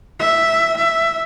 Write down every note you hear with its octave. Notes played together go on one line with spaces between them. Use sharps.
E5
E5